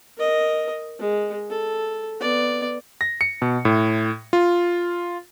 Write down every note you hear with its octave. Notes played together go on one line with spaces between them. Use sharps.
A#4 D#5
G#3
A4
B3 D5
A#6
C#7
B2
A2
F4